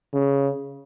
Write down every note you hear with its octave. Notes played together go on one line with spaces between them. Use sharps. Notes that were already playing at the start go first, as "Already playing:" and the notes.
C#3